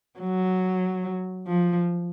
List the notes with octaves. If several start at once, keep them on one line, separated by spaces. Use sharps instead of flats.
F#3
F3